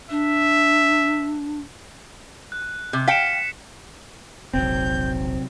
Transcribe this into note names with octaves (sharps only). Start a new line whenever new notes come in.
D4 E5
F#6
C3
F5 G5 B6 C#7 E7
E1 A#1 C3 F#3 C4 G6